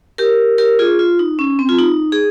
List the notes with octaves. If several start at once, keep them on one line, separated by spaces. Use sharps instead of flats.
G4 A#4
G4 A#4
F4 G#4
F4
D#4
C#4
C4
F4
D#4
G#4